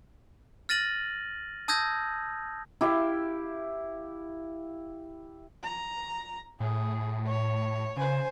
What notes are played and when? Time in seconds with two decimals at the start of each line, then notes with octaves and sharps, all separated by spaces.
0.69 F6 A6 A#6 D#7 F#7
1.68 A5 D#6 E6 G6 G#6 A#6
2.81 E4 G4 E5 F5
5.63 A#5
6.60 A2 G#4
7.26 C#5
7.97 C#3 C5 G#5